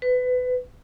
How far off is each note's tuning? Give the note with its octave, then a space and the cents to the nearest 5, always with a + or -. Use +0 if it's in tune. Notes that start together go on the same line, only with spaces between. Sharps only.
B4 +25